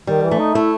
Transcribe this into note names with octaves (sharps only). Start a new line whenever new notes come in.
D#3 G3
E3
A3
D#4
A3 E4